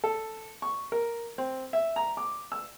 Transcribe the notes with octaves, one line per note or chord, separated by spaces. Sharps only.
A4
C#6
A#4
C4
E5
A#5
D6
E6